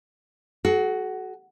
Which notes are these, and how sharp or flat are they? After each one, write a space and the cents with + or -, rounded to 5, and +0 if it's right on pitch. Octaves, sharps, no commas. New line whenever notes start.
F#4 +15 A4 -45